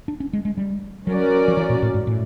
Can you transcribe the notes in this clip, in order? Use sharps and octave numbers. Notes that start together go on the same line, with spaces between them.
D4
C#4
G#3
G#3
G3
F#3 C#4 F#4 A#4 D5
F3
E3
A#2
A2
G#2
A2